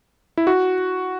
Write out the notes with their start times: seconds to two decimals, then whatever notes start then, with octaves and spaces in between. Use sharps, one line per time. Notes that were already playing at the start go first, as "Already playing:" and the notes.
0.37 E4
0.47 F#4